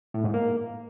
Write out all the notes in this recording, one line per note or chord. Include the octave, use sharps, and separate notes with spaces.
A2
G#2
A#3